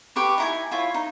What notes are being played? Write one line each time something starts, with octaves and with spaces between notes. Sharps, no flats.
G4 B4 C#6
D#4 E4 G#5
E4 F4 C#5
D#4